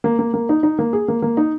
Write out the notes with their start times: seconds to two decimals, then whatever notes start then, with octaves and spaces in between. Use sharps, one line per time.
0.04 A#3
0.19 A#3
0.34 A#3
0.49 D#4
0.63 D#4
0.79 A#3
0.93 G#4
1.08 A#3
1.22 A#3
1.37 D#4